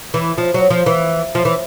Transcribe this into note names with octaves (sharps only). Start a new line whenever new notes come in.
E3
F3
F#3
F3
E3
F3
E3